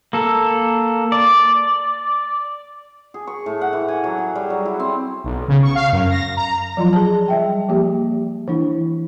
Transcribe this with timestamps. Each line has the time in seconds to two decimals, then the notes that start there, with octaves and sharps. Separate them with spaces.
0.13 A#3 A4
1.12 D5
3.14 G#4
3.27 C#6
3.46 A2
3.61 F#5
3.73 E3
3.88 G#5
4.04 F#3
4.18 G#4
4.35 G3
4.50 F#3
4.65 E4
4.80 C4
5.24 B1
5.48 C#3
5.63 C#6
5.75 F5
5.92 F#2
6.10 A#6
6.37 A#5
6.77 F3 F#3 F4 C6
6.93 G#4 A5
7.28 G3 E5 G5
7.69 F3 A#3 G4
8.48 E3 D4 E4